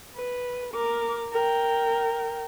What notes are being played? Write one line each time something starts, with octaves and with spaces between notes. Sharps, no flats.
B4
A#4 D6
A#4 G5